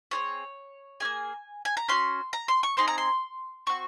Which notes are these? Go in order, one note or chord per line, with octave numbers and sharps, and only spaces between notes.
C4 F4 G#4 C#5
A#3 C#4 G#4 G#5
G#5
A#5
C#4 F#4 C6
A#5
C6
C#6
C4 D#4 G#4 C6
A#5
C6
C4 F#4 C#6